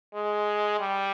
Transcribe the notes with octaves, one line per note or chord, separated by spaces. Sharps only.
G#3
G3